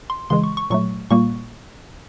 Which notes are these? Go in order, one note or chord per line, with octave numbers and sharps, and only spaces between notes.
C6
C#3 E3 G#3 C6
C#6
C#6
A#2 F#3 A3 C#6
A#2 G3 A#3 C#6